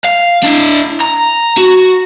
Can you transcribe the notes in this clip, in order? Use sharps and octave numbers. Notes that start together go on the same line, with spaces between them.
F5
D4 E4
A#5
F#4